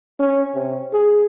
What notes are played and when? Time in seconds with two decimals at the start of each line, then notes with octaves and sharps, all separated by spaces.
0.19 C#4
0.54 C3
0.93 G#4